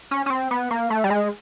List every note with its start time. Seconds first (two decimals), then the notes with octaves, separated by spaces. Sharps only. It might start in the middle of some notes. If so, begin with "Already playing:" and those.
0.11 C#4
0.26 C#4
0.30 C4
0.51 B3
0.71 A#3
0.90 A3
1.04 G3
1.10 G#3